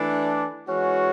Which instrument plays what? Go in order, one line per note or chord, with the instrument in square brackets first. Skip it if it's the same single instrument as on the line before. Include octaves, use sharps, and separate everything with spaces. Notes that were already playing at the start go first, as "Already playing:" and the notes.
Already playing: [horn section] E3 A3 D4
E3 G#3 C#4 F#4